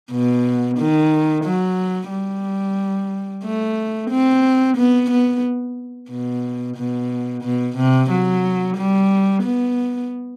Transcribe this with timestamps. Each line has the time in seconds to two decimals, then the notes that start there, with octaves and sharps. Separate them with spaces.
0.11 B2
0.78 D#3
1.44 F#3
2.11 G3
3.44 A3
4.10 C4
4.77 B3
5.11 B3
6.10 B2
6.77 B2
7.43 B2
7.76 C3
8.10 F#3
8.77 G3
9.43 B3